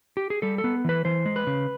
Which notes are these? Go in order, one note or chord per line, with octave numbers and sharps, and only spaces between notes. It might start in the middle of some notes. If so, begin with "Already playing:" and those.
G4
G#4
G3 A4
A4
B3
E3 B4
E3 C5
G#3
B4
C#3